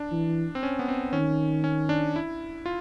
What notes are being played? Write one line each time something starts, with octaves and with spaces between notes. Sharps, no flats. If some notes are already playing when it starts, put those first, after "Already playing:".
Already playing: D4
E3
C4
C#4
B3
C4
D#3 C#4
C#4
D4
E4
F4